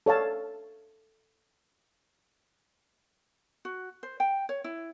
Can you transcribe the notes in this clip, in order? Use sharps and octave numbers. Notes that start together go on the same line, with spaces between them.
A4 C#5 F5 A5
F#4
C5
G5
C#5
E4